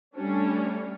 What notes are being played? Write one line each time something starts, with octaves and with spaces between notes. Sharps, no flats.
G3 A3 C#4 D4